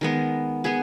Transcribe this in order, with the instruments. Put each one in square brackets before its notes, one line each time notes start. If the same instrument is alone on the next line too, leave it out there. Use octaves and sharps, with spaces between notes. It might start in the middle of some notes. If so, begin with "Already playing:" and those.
[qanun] D#3 G#3 B3
B3 G#4 B4